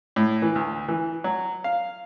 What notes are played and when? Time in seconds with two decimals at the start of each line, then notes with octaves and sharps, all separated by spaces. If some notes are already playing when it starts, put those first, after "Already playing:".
0.16 A2
0.42 E3
0.55 D2
0.88 E3
1.24 F#3
1.64 F5